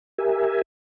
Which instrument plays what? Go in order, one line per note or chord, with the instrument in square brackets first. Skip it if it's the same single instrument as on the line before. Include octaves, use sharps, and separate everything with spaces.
[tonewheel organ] G4 A#4 E5 G#5